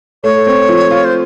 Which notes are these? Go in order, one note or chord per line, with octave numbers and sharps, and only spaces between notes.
A3 C#5
C4
F3
F4
C5